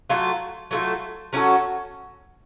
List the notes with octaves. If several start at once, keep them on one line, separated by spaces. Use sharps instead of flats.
F#3 A3 F4 A4
F#3 A3 F4 A4
F#3 C#4 F#4 A4